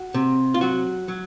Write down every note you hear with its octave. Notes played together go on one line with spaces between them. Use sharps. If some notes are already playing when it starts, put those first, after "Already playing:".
Already playing: F#4
C3
F4
F#3 F#4
F#3